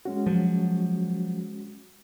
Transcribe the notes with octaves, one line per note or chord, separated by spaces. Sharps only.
G#3 C#4 F#4
F3 F#3